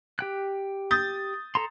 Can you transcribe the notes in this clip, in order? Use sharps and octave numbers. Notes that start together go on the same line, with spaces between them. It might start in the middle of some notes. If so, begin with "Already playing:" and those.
G4 G5 F#6
D#6 G6 A6
A4 A#5 C6